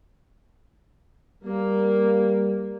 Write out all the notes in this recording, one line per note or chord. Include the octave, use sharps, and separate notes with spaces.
G3 A#3